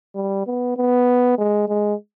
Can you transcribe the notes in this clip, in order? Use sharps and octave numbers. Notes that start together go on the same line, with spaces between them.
G3
B3
B3
G#3
G#3